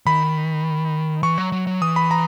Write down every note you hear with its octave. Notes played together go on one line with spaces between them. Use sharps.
D#3 B5
E3 C#6
F#3
F#3
F#3
E3 D#6
B5
A#5